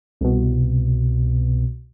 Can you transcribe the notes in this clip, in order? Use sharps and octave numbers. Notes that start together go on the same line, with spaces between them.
C2 B2